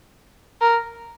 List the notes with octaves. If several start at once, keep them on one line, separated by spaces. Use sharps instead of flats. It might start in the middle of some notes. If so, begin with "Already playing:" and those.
A#4